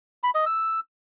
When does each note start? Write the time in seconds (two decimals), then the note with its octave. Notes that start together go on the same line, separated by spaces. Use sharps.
0.23 B5
0.35 D#5
0.46 E6